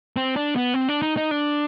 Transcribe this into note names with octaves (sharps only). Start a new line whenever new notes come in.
C4
D4
B3
C4
D4
D#4
D#4
D4